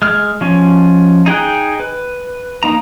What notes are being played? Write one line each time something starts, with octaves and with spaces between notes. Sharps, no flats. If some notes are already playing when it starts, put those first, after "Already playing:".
G#3 F6
F3 C#4
D#4 G#4 G5 F#6
B4
A#3 D#4 A#5